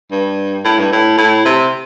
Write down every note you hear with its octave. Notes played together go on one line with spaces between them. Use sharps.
G2
A2
G2
A2
A2
C3